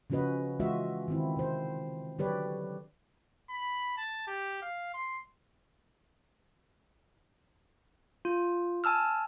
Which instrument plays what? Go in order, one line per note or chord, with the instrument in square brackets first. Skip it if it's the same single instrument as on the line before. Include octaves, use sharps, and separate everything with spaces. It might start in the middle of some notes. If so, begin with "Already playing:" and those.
[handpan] C#3 F3 C#4 F#4 B4 D#5
E3 G#3 F4 F#4 D#5 E5
D#3 C4 E4
C3 C5
D3 F#3 G4 B4 C#5 D5
[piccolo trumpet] B5
A5
G4
F5
C6
[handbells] F4
G#5 A5 E6 F6